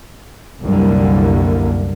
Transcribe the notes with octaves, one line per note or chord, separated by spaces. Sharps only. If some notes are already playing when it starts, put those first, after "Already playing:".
C2 F#2 D3 G3 A#3